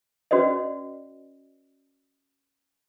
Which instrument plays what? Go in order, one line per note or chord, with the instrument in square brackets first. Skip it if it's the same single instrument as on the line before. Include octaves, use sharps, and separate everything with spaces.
[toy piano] C#4 F#4 B4 D5 D#5